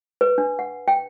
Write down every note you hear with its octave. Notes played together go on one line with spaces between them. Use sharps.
B4
D4
F#5
G5